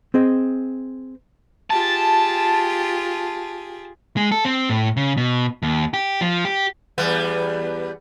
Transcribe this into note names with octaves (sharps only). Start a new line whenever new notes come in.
C4 G#4 D#5
F4 G4 G#4 A5
G#3
A4
C4
A2
C#3
B2
D#2
G4
F3
G4
E2 G3 B3